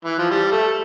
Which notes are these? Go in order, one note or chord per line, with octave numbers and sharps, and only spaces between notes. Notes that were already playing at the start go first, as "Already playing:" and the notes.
E3
F3
G3
A3